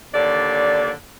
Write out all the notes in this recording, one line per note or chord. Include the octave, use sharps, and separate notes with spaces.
D#2 D3 D5